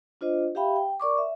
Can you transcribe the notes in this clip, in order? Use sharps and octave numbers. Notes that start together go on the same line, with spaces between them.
D4 F4 C5 D#5
G4 E5 F5 G5 B5
G5
A#4 D5 C#6 D6
E5